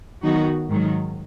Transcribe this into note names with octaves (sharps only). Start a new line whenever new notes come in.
D#3 F#3 B3 D#4 F#4
G#2 D#3 F#3